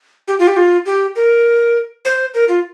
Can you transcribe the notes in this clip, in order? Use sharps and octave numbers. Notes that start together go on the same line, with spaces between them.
G4
F4
G4
F4
G4
A#4
C5
A#4
F4